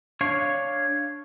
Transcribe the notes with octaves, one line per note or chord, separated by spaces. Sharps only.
D4 C#5 F5 C#6